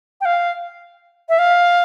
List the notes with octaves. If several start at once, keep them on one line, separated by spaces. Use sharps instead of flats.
G5
F5
E5
F5